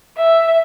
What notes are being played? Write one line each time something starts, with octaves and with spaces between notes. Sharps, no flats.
E5